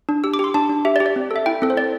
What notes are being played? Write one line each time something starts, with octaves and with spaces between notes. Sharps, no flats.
D4
G4 E6
D6
G4 C6
D4 A5
D4
G4 E5
D5
G4
D5
C4
A4 E5
E4 G5
C4 A4
C5
C4 D5